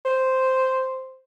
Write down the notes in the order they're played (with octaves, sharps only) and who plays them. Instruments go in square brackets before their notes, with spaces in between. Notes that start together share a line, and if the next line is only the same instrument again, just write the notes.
[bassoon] C5